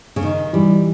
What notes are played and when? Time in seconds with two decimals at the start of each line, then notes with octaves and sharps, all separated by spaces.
0.16 C#3
0.22 D#3 D#4
0.53 E3 G3